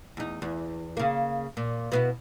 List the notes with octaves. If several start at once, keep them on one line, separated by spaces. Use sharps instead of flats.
E2 D#4
E2
C#3 A#3
A#2
B2 B3 E4